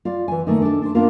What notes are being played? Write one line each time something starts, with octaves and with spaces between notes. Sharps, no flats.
F4 D5
E3 G#5
D#3 A3 A#3 D#4
D4 A4
D4 C5
A#3 B3 D4 F4 A#4